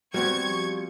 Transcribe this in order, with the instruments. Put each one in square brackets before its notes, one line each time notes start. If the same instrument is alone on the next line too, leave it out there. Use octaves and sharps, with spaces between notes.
[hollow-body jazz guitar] G3 B3 C4 [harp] F#4 G4 [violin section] C#6 G#6
[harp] F3